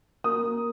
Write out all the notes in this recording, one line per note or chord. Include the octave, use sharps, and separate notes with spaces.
A#3 D#6
A#3